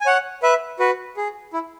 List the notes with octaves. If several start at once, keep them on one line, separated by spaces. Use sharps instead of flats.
G#5
C#5 F#5
B4 E5
F#4 B4
G#4
E4